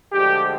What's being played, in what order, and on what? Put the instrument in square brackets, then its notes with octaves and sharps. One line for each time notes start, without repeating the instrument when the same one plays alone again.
[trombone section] D2 D3 F3 G#3 G4